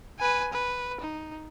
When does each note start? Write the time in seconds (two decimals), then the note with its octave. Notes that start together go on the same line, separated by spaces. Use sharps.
0.19 B4 G#5
0.53 B4
1.01 D#4